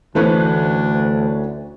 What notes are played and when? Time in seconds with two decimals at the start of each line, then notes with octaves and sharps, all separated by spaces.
0.15 D2 E3 A3 C#4 D4 B4 C5